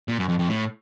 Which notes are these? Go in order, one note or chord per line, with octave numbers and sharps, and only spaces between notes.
A#2
F#2
F2
F2
A2